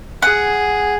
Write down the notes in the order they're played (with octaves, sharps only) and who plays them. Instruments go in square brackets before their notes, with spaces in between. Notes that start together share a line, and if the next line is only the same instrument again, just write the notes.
[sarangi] G#4 [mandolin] F#5